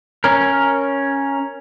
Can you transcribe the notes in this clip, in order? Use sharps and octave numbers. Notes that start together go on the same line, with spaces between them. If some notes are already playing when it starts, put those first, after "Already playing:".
C#4 A#4